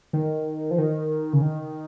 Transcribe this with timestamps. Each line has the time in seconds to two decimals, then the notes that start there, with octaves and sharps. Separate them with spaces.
0.13 D#3
0.71 F3
0.78 D#3
1.33 C#3
1.42 D#3